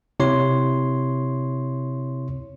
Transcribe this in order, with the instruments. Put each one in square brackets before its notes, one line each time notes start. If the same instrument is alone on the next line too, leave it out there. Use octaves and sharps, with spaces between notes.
[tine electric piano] C3 E4 C#5 C6